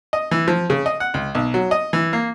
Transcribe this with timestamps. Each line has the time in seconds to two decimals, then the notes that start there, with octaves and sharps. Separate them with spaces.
0.13 D#5
0.31 E3
0.48 F3
0.70 C#3
0.86 D#5
1.00 F#5
1.14 C#2
1.35 B1
1.54 F#3
1.71 D#5
1.93 E3
2.13 A#3